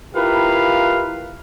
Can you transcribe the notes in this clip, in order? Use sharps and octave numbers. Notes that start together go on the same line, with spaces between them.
E4 F4 G4 A#4 B4 F5